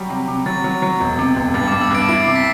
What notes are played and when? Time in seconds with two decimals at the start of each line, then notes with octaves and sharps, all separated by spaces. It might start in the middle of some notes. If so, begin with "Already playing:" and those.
Already playing: F#3 G3
0.10 C3
0.28 C3
0.46 F#3 A6
0.64 F#3
0.82 F#3
1.00 E1
1.19 C3
1.36 E1
1.54 G2 A6
1.68 G2 D6
1.81 E6
1.91 G2 D6 D7
2.08 E4 D6 D7
2.22 C3 C7
2.36 B6